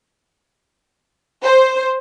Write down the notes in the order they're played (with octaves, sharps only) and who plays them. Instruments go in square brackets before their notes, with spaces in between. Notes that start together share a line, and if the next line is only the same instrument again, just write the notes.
[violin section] C5